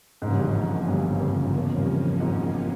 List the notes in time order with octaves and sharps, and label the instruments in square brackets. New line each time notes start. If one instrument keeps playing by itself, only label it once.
[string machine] E2 C#3 F3 A#3 C#4 [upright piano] G#2
[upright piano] G2
G#1 G#2
G1 G2
G2
F2
E2
G2
F2
G#1 G#2